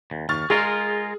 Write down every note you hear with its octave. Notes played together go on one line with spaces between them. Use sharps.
D#2
D#2 C#6 F6 A6
G#3 F4 G#4 A#4